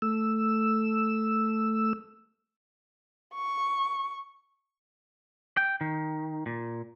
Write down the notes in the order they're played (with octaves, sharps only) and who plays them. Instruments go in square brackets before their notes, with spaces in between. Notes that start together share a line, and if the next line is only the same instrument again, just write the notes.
[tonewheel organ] A3 E6
[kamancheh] C#6
[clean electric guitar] G5
D#3
A#2